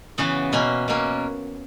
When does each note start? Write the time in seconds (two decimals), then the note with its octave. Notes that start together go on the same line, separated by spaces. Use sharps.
0.18 C#3 E3 B3 F#4
0.53 B2 A#3 C#4
0.88 B2 A#3 C#4